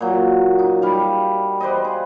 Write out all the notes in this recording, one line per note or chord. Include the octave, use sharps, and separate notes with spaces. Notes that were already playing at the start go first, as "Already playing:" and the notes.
A#2 F#3
D#4
G3 F5
B4 C5 D5 D#5
G#4